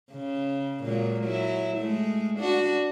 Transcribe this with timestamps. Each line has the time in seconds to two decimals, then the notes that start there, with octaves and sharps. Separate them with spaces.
0.12 C#3
0.84 A#2 F#3 G#3
1.21 F#3 E4
1.77 G#3 A3
2.39 D4 F#4